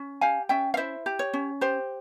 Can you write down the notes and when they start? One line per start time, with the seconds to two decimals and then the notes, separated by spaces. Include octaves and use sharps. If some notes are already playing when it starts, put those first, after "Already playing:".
Already playing: C#4
0.21 G4 F5 G#5
0.49 C#4 E5 G5
0.74 F5
0.77 E4 C5 E5
1.06 G4
1.19 C#5
1.33 C#4
1.61 G4 C5